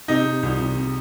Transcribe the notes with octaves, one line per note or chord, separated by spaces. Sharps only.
C3 D#4
C3
C2
C2
C3